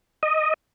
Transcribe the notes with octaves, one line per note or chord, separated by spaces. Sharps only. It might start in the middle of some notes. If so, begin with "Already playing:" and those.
D#5